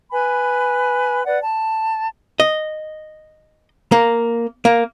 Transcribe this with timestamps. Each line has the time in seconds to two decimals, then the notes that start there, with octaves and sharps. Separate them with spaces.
0.12 B4 G#5 B5
1.26 B4 D5 F#5
1.42 A5
2.40 D#5
3.92 A#3
4.65 A#3